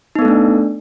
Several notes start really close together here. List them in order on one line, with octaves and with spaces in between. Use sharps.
D#4 B3 A4 A3 D4